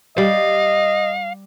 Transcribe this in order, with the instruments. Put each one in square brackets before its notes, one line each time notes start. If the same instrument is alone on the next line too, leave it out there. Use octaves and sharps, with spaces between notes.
[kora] G3 [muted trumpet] D#5 [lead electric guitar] F5